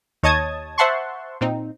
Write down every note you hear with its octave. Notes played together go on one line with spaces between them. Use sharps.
D#2 C#5 D#5 A5 D#6 G#6
C5 E5 F#5 A5 C6 C#6
A#2 C4 D#4